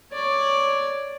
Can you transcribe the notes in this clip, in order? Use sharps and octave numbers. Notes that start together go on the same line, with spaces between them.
C#5 D5